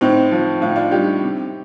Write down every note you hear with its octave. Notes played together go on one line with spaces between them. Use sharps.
A2 C4 D#4
F3
A2 F4
D#4
D4 F4
G3 D#4 G4
C3